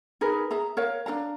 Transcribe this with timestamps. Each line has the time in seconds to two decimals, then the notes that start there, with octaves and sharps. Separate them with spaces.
0.21 D#4 G#4 A#4 B4
0.51 G#4 E5 A#5
0.77 A#4 C#5 F5
1.06 D4 A#4 F5 A#5